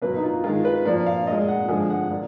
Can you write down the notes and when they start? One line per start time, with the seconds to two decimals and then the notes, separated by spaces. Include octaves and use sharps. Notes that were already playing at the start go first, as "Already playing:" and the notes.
0.02 B2 F#3 A#3 B4
0.16 D#4
0.23 F4
0.44 D#3 G#3 F4
0.65 B4
0.85 A#2 F3 A#3 D5
1.06 F5
1.27 A#2 G#3 D#5
1.48 F#5
1.68 D3 F3 G#3 G#5
1.90 F#5
2.10 A#2